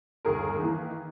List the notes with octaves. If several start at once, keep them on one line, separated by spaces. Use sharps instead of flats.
G1 D#2 G#4 A#4
D#3 E3 A#3